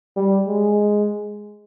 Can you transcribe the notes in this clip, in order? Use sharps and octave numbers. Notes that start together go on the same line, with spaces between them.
G3
G#3